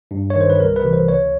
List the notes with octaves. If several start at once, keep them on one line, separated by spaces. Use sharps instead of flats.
G2
C#5
D#3
C5
B4
C2 A#4
B4
C3 E3
C5
C#2 C#5